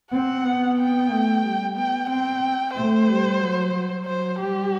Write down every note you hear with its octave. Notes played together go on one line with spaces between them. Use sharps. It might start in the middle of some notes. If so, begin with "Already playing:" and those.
C4 F#5
B3
G5
A3
G3
B3 G5
C4 G5
A3 C5
G3
F#3
F#3
C5
G3 G4